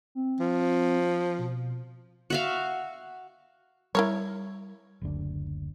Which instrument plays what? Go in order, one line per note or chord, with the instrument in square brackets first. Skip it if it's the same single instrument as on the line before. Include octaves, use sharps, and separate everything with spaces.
[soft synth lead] C4
[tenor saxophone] F3
[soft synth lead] B2
[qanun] F#4 E5 F5
[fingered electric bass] G3 [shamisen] E4 A#4 C#5
[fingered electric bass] F#1 D2 D4